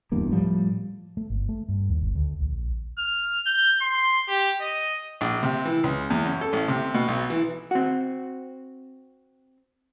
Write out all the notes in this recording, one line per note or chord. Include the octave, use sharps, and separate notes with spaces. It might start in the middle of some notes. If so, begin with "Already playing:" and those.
D1 E2 G2 A#3
A2 F3 G3
A3
G1
A3
G2
D#2
G1
D2
A#1
F6
G6
C6
G4
D#5
A#1
C3
E3
C#2
E2
F#2
A4
A1
C3
B2
B1
E3
C4 F#4